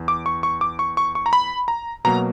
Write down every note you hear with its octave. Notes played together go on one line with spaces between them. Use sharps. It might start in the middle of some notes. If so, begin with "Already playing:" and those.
Already playing: E2
D6
C#6
C#6
D6
C#6
C#6
C#6
A#5
B5
A#5
B2 F#3 A#3 A#5